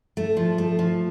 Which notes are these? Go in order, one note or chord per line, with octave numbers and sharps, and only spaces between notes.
A3
F3
A3
F3